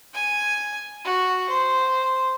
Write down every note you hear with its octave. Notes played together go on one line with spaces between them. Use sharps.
G#5
F#4
C5